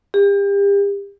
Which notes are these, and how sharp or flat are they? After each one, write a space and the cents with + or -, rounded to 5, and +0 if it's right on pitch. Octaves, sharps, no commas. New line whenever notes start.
G4 +35